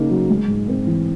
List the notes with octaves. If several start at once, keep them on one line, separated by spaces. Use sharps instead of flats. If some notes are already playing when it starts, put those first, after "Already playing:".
Already playing: C#3 A#3 D#4
F#3
G#3
G#2
C4
E3